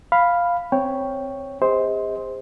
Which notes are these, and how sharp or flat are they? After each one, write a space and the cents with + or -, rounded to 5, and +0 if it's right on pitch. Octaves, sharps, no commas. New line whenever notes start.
F5 +0 B5 +0
C4 +0 C#5 +0 G5 +0
G#4 -45 C5 +0 D#5 +35